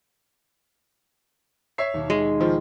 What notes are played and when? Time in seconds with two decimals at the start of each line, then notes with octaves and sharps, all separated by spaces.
1.78 C#5 E5 C7
1.94 D#2 B2
2.10 G#3 F5
2.40 D#3 F3 F4